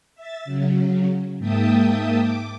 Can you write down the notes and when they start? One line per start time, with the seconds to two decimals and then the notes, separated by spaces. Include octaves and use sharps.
0.15 E5 A6
0.45 C#3 F#3
1.38 G#2 A#3 E5 G5 A5 D#6
2.18 D6